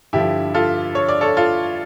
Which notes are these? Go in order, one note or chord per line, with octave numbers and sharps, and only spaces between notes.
G2 D3 F3 E4 G4
F4 A4
C#5
D5
A4 C#5
F4 A4